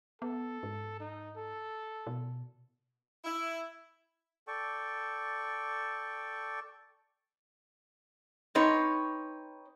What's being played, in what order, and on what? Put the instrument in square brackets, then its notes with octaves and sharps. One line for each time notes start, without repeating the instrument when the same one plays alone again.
[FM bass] B3 [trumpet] A4
[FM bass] G#2
[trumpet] D#4
A4
[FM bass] B2
[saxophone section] E4
[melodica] A4 D5 G5 C#6
[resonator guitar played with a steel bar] C4 D#4 B4 C#5